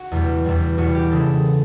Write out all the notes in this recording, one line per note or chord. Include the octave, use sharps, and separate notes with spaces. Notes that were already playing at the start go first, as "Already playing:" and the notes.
Already playing: F#4
E2 B2 G3
E2 B2 G3
E2 B2 G3 F#4
G4
C#3 E3 G#3 A4